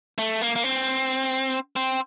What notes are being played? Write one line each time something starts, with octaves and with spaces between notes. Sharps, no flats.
A3
A#3
A#3
C4
C4